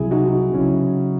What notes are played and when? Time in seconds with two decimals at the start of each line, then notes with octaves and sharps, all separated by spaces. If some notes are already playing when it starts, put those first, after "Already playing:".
Already playing: C2 C3 F#3 E4 G#4
0.11 D#4 F#4
0.53 C#3 F#3 C#4 E4